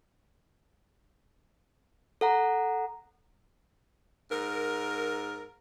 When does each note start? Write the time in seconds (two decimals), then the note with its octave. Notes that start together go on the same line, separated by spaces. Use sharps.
2.21 A4 F#5 A#5
4.31 G#2 A#4